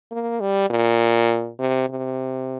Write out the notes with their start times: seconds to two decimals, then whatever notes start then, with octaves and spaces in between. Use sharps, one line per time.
0.12 A#3
0.41 G3
0.70 A#2
1.59 C3
1.90 C3